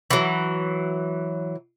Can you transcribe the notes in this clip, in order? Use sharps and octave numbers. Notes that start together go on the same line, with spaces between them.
E3 F#3